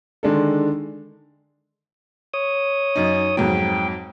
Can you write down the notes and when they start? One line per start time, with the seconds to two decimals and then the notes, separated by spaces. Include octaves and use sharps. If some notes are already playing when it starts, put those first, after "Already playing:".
0.23 D3 D#3 G#3 D4 A4
2.34 C#5 D#6
2.96 F#2 D#4
3.37 F2 G#2 F#3 G5